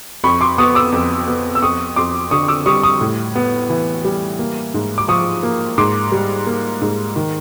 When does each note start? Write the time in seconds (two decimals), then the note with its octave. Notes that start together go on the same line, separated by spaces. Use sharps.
0.24 F2 B5 C#6
0.41 C6 D6
0.58 B3 C#6 D#6
0.75 D6 E6
0.92 F2
1.28 B3
1.55 E6
1.62 F2 C#6 D#6
1.96 F2 C6 D6
2.31 D3 C#6 D#6
2.48 D6 E6
2.66 G3 C#6 D#6
2.83 C#6 D#6
3.01 A2
3.35 B3
3.70 E3
4.04 G3
4.39 A#3
4.74 G#2
4.98 D6
5.08 F3 C#6 D#6
5.43 A#3
5.78 G#2 C6 D6
6.12 G3
6.46 A#3
6.82 G#2
7.16 D#3